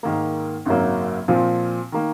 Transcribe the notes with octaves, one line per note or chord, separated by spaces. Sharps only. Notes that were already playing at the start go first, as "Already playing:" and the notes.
G#2 D#3 A#3
G#1 F#2 C#3 F#3 A#3
A#2 F3 C4 F4
D#3 A#3